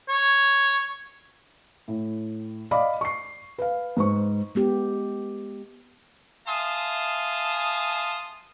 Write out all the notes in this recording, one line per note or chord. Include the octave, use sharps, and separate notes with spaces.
C#5
A2
D5 D#5 F5 B5 D6
C#6 C7
B4 F5
G#2 B4 C5 C#6
G#3 B3 G4
E5 F5 G#5 A5 C6 D#6